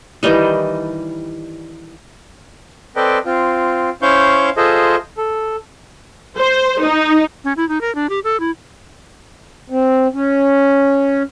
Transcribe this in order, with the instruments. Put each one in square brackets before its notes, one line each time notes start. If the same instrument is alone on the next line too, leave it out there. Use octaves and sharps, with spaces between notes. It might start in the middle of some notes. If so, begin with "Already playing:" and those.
[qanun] D#3 E3 G3 D#4
[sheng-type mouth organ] C4 A4 B4 D5 D#5 G5
C4 F4
C#4 E4 C5 F5 C#6 G6
F4 G#4 A4 C5 D#5 E5
A4
[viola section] C5
D#4
[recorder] C#4
E4
D#4
A#4
D4
G4
A4
E4
[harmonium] C4
C#4